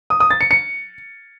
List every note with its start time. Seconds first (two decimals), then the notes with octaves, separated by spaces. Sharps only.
0.10 D#6
0.20 D#6
0.30 A6
0.41 C#7
0.51 C#7